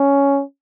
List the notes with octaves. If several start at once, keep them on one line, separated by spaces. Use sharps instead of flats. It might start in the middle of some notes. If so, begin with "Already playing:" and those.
Already playing: C#4